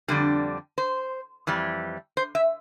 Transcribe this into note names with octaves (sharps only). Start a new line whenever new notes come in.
F2 D3 G3 D4
C5
F2 E3 G3
C5
E5